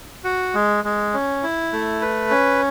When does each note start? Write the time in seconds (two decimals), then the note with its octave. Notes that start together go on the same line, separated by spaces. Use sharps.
0.24 F#4
0.54 G#3
0.84 G#3
1.14 C#4
1.43 E4
1.73 A3
2.02 B4
2.31 C#4